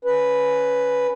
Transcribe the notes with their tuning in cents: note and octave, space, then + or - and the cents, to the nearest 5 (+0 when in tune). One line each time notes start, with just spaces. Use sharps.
C#4 +10 B4 +0